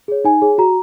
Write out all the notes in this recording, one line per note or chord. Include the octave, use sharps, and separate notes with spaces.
G#4 C#5
D#4 G#5
G#4 C#5
F#4 A#5